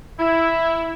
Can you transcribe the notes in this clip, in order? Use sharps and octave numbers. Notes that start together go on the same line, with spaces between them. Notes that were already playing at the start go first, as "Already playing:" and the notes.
E4